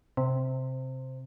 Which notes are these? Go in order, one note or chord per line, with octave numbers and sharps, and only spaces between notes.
C3